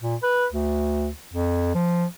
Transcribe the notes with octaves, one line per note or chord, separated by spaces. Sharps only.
A#2
B4
D2
F2
F3